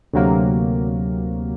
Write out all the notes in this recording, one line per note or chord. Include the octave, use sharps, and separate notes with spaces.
D2 C3 F#3 A#3